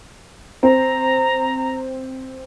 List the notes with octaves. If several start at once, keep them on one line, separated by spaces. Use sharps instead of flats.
C4 A#5